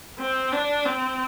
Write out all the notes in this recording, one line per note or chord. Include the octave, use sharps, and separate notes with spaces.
C4
D4
C4